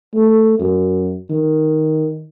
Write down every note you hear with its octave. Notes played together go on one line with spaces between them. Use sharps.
A3
F#2
D#3